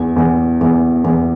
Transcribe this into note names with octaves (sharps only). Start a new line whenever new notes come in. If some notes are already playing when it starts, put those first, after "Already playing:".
Already playing: E2
E2
E2
E2